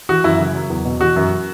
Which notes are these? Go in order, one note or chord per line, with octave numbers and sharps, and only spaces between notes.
E3 F#4
F#2 E4
C#3
F#3
E2
B2
E3 F#4
F#2